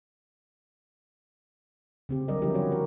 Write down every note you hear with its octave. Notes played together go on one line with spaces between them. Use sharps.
C#3 C4 G4
D3 F#3 G3 A#4 D5 D#5
F3 C#4 D4 E4 G4 A#4
F#4 C#5
A#4